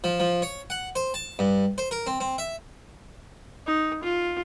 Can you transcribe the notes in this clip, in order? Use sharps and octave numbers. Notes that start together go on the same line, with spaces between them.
F3
F3
C#5
F#5
C5
A5
G2
C5
A#4
C4
C4
E5
D#4
F4